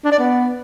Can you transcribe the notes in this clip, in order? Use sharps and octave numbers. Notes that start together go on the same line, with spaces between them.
D4
D5
B3